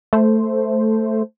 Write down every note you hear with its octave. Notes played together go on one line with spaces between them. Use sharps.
A3 C5